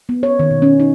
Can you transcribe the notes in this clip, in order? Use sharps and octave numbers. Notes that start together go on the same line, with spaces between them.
B3
C#5
D#3
B2
C#4
D#4